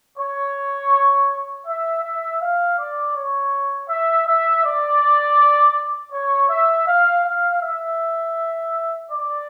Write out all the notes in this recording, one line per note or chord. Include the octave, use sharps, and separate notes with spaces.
C#5
E5
E5
F5
D5
C#5
E5
E5
D5
C#5
E5
F5
F5
E5
D5